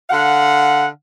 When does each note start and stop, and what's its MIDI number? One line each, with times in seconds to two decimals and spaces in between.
0.10 0.86 50
0.10 0.86 77
0.10 0.86 78